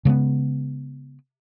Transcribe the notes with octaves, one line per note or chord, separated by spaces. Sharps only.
C#3 G#3 A3 B3